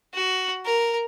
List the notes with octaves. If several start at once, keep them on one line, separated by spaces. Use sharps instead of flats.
F#4
A#4